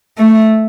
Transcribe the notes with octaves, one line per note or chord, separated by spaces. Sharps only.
A3